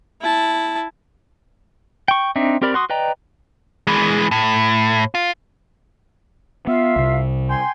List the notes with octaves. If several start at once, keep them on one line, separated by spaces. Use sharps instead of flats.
E4 A5
G5 C#6
C4 D4 D#4 E5
C4 G4 A#4 D5 B5
F#4 C6 D#6
B4 D5 D#5 G5 A#5
E3 G#3
A2
F4
B3 F4 E5 F5
C2 C3
G5 G#5 C6